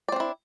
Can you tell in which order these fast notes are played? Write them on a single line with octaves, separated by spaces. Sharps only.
D5 C4 D4 E4